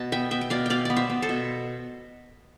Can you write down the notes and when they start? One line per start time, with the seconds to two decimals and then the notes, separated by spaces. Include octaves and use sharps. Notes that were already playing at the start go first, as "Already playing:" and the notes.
Already playing: B2 A5
0.12 B3 E5 G5
0.31 B3 E5 G5
0.41 G5
0.50 B2 D5 F5
0.66 B2 D5 F5 G5
0.85 B3 D5
0.96 C5 E5
1.10 B3
1.22 A4 C5
1.29 B2